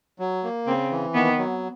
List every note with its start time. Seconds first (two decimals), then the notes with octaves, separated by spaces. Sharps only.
0.19 F#3
0.44 A#3
0.67 C#3 C4
0.90 E3
1.14 D#3 B3
1.38 F#3